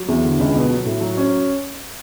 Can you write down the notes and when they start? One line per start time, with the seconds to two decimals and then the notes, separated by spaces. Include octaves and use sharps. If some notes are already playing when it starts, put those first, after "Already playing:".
Already playing: F#3
0.08 E2
0.24 D3
0.39 C#2
0.55 B2
0.71 F#3
0.85 A2
1.01 F#3
1.17 C#4